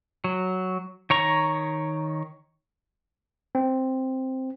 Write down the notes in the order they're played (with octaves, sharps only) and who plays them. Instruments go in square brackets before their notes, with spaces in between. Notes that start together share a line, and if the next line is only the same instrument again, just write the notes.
[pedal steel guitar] F#3
D#3 C#5 A#5 C#6
[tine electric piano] C4